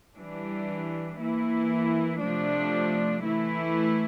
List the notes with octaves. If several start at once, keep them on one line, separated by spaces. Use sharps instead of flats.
E3 G3 D4
E3 A#3 E4
C3 F3 A3 D4
E3 A3 E4